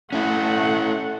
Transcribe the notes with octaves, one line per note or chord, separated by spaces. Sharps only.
A3 C#4 E4 F#5